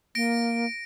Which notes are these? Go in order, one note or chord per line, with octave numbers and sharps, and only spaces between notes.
A#3 A#6 D7